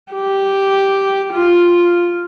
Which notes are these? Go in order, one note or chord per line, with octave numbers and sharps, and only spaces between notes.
G4
F4